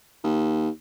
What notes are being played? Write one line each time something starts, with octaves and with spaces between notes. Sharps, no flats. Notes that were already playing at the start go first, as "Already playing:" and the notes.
D#2